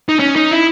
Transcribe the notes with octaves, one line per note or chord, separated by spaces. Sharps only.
D#4
C#4
D#4
E4